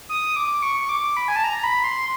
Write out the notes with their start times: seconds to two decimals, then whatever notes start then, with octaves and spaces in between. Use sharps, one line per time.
0.09 D#6
0.36 D6
0.62 C#6
0.81 C#6
0.89 D6
1.17 B5
1.28 G#5
1.36 A5
1.44 A#5
1.64 B5
1.84 C6